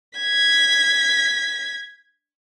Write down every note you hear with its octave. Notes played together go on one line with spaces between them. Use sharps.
G#6 B6